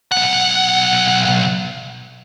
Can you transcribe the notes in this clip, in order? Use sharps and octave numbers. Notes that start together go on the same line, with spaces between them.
B1 F#5